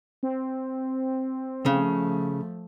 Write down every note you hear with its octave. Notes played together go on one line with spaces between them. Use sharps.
C4
C#3 F3 A3